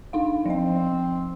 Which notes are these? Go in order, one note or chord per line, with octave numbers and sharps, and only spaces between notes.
D4 D#4 F5
F3 C4 D#5